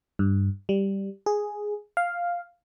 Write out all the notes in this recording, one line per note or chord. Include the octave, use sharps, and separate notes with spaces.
G2
G3
G#4
F5